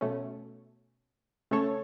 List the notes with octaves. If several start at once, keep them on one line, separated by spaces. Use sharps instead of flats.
B2 A3 C#4
C#3 A3 C#4 A4 C#5